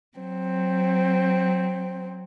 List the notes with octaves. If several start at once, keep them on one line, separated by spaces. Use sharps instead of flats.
F#3 C4